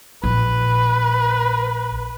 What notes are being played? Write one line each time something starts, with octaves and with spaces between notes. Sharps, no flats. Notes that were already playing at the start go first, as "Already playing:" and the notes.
A#1 B4